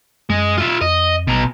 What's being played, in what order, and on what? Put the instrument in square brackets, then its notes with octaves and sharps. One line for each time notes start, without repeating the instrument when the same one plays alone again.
[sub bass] F#2 [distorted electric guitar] G#3
[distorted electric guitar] F4 E5
[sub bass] F2 [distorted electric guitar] D#5
[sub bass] A1 [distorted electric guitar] B2 A#5